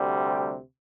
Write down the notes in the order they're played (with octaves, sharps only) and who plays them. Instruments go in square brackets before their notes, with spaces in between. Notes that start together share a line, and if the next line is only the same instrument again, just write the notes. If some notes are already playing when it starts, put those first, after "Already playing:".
Already playing: [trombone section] D2 C3 G3
G4